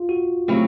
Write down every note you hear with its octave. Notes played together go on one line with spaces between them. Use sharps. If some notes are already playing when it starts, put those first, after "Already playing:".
Already playing: F4
F#4
C#3 F#3 A3 C4 E4 G4